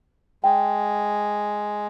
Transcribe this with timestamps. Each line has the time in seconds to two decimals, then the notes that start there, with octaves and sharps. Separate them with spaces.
0.44 G#3 G5